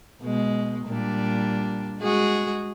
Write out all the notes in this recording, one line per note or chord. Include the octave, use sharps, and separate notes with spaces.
B2 G#3
A#2 G3 D4
G#3 F#4 G#4